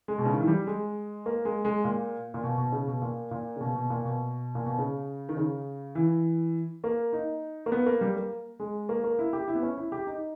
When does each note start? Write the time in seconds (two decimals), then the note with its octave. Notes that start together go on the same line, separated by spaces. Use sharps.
0.08 G#3
0.18 B2
0.25 C#3
0.33 D#3
0.40 E3
0.47 G3
0.67 G#3
1.26 A#3
1.45 G#3
1.65 G#3
1.84 A#2
2.34 A#2
2.43 B2
2.58 B2
2.72 C#3
2.87 B2
3.02 A#2
3.31 A#2
3.56 C#3
3.61 B2
3.75 B2
3.90 A#2
4.05 B2
4.55 A#2
4.66 B2
4.78 C#3
5.29 D#3
5.37 C#3
5.95 E3
6.84 A#3
7.13 D#4
7.66 A#3
7.72 B3
7.86 A#3
8.01 G3
8.16 A#3
8.60 G#3
8.89 A#3
9.04 A#3
9.19 E4
9.33 G4
9.48 E4
9.55 B3
9.63 C#4
9.77 E4
9.92 G4
10.07 D#4